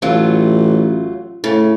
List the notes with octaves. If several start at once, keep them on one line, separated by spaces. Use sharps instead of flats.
A1 F#3 A3 F4
A2 C#3